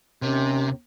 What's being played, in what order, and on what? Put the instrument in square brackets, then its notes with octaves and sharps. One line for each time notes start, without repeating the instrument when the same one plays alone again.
[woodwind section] D#2 C#4 [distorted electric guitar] C3